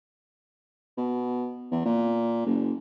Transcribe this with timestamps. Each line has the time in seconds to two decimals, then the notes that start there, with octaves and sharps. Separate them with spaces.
0.97 B2
1.71 E2
1.85 A#2
2.46 F#1